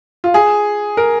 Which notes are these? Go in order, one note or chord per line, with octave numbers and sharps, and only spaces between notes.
F4
G#4
A#4